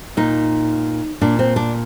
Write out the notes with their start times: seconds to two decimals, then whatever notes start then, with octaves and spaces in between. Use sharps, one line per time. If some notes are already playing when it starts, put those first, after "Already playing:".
0.17 A#2 D#4
1.21 A#2 D4
1.39 C4
1.56 D4